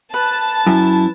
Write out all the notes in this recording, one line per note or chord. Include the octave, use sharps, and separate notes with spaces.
B4 A5
F#2 E4